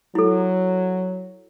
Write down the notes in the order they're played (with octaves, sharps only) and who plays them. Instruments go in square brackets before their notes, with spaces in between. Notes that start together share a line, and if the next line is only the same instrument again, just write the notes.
[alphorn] F#3 [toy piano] E4 A4